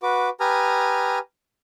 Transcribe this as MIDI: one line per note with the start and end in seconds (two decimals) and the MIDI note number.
0.03 0.29 66
0.03 0.29 71
0.03 0.29 86
0.40 1.19 67
0.40 1.19 71
0.40 1.19 80
0.40 1.19 82
0.40 1.19 87
0.40 1.19 89